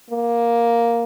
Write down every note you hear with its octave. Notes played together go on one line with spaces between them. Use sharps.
A#3